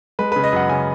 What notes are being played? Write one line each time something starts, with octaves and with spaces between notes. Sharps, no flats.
G#3 B4
C#3 B4
D#5
F#2 F#5
C#3 G#5